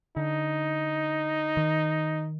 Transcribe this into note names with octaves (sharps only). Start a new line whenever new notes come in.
D3 D#4
D#3